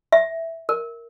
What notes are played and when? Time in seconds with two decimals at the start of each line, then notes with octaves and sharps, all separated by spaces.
0.12 E5
0.69 A#4